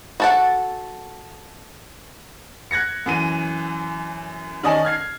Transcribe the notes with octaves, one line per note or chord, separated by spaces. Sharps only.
F#4 A4 F#5
F#6 G#6 A#6 C#7
F#2 E3 D#7
D#3 C#4 D5 D#5 G#5 A5
F6 G#6 C7